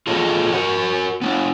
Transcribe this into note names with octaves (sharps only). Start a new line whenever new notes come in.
F4 G#4 A4 C#5 D#5
F#4 A#4 F#5
B3 D4